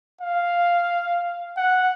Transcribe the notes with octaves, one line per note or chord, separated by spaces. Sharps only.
F5
F#5